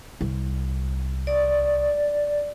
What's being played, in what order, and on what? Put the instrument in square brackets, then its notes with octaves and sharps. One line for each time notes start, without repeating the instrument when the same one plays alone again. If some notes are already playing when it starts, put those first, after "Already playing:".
[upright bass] C2
[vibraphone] D5